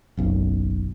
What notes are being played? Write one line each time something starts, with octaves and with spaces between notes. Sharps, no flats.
F#1 B1 F#2